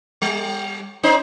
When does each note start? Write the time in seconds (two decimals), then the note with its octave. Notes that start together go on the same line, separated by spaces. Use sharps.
0.22 G3
1.03 C#4 D#4 C5